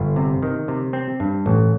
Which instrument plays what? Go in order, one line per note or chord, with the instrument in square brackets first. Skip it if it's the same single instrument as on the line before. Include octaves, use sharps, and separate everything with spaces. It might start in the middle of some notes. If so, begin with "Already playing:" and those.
Already playing: [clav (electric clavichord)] G1
C3
D#3
C3
C4
G2
A1